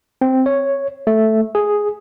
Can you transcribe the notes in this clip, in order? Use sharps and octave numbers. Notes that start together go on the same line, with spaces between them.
C4
C#5
A3
G#4